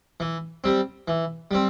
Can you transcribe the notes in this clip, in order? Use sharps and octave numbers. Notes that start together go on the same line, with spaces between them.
E3
G3 C4
E3
G3 C4